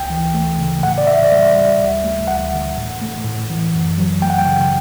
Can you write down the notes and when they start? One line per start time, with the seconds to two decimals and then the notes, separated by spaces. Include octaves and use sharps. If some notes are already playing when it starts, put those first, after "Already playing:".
Already playing: D2 G5
0.10 E3
0.34 A3
0.59 C#3
0.83 A2 F#5
0.98 D5
1.07 A2 E5
1.25 D5
1.32 G3 E5
1.56 G3
1.80 D2
2.04 A3
2.27 D2 F#5
2.53 D3
2.76 A2
3.01 A3
3.24 A2
3.50 E3
3.74 F#2
3.98 F#3
4.22 A3 G5
4.30 F#5
4.38 G5
4.46 C#3